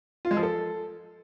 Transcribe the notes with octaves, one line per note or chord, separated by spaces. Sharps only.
F4
G#3
F3
A4